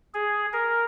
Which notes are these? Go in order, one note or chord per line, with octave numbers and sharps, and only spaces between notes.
G#4
A#4